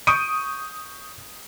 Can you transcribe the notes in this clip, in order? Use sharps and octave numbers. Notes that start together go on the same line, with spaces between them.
C#6 D#6 G6 D7 D#7